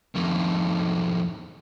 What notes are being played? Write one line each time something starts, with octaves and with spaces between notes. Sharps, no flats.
F2 D#3